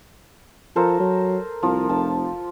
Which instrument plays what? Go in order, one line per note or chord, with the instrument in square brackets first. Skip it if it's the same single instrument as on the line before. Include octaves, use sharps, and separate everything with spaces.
[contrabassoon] F3 [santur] A4 A#4 C5
[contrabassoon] F#3
[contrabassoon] C2 [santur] F3
[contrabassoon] F1 [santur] A5